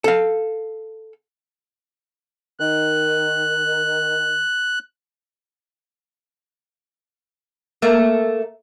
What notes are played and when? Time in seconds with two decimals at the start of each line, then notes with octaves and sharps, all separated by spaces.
0.04 A4 F5
2.60 D#3 F#6
7.82 A3 A#3